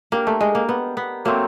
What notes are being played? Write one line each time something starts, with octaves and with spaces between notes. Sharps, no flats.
A#3 D4 G4 A#4
A3
G#3
A#3
B3
B3
F#3 A3 A#3 C4